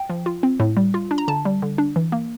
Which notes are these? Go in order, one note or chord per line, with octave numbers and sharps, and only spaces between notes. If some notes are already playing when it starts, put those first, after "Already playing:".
Already playing: G5
F3
F4
C4
A2
G3
F4
D4
A#5
D3 A5
G3
D3
D4
E3
A#3